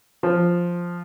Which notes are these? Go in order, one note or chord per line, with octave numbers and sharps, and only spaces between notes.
F3